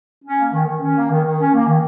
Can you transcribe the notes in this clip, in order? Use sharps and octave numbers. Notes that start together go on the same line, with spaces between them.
C#4
A#3
D#3
D#3
C#4
A#3
D#3
D#3
C#4
A#3
D#3